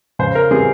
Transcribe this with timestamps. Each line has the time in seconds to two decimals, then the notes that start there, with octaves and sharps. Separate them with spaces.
0.19 C#3 C5
0.35 A#4
0.51 E3 G3 C4 G#4